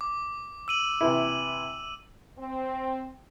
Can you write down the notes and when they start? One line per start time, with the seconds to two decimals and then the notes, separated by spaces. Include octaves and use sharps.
0.01 D6
0.68 E6 D#7 F#7
1.01 C3 E3 E4
2.38 C4